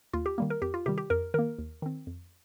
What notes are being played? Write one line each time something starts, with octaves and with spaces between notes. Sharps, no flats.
D#2 F4
G4
D#3 G3 A#3
A#4
F2 G4
F4
C3 D#3 G3 G4
G4
F2 A#4
D#3 A#3 A#4
D#2
D#3 C4
F2